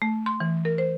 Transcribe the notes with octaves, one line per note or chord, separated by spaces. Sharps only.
A3
C6
E3
A#4
C5